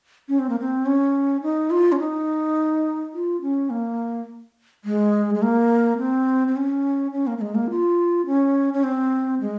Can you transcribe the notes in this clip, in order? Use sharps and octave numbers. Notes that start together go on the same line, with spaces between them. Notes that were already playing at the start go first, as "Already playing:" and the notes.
C#4
C4
A#3
C4
C#4
D#4
F4
C#4
D#4
F4
C#4
A#3
G#3
G#3
A#3
C4
C4
C#4
C#4
A#3
A#3
G#3
A#3
F4
C#4
C#4
C4
G#3